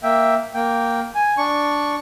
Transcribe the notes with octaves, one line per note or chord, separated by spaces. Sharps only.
A#3 E5 G5
A#3 G5
G#5
D4 C#6